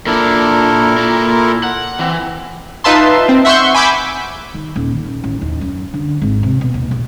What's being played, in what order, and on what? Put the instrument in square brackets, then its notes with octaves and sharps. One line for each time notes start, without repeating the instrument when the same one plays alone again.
[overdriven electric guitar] A#2 D4 [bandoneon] E4 A4 A#4
[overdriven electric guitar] A#2
F#5
[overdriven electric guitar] E3 [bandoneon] C4
[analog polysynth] D#4 F4 B4 E5 A5 C6
C4
E5 F#5 C6 C#6 E6 G6
G#5 B5 D6 E6 G6
[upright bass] D#3
D#1
D#3
A1
D#2
F#2
D3
G#1
C3
B2
D#2
A#1